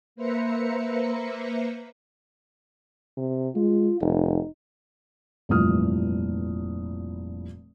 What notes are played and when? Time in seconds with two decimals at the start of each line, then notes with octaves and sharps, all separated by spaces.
0.16 A#3 B4 C5 E5 A#5 C#7
3.17 C3
3.55 G#3 F4
4.01 F1 D#4
5.49 F1 G2 A#2 E3 D#6 F6